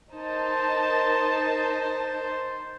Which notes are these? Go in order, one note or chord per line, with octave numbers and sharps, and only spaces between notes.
D#4 A#4 C5 A5